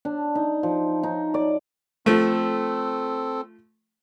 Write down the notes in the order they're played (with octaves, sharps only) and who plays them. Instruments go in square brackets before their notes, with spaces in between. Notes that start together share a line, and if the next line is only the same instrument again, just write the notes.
[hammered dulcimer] D4
D#4
F3
D#4
D5
[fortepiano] F3 A3 [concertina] C4 A4